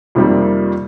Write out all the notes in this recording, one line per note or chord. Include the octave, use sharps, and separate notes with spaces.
F2 C3 D#3 G3 A#3